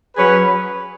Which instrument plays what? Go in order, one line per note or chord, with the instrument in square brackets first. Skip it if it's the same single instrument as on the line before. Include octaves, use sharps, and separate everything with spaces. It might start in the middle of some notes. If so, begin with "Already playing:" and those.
[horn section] F#3 C#4 G#4 B4